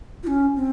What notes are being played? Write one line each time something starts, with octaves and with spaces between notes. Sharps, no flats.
F4
C#4
C4